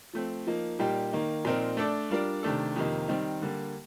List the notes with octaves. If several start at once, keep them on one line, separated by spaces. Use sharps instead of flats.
F3 A3 C4
F3 A#3 D#4
A#2 G3 A#3 D#4 G4
D#3 A#3 D#4
A#2 F3 C4 D#4 A#4
A3 D4 A4 D5
G3 D4 F4 A#4 D5
C3 D#3 A3 D4 A4
F2 C3 D#3 A#3 D#4
D#3 G3 C4 D#4
D3 G3 A#3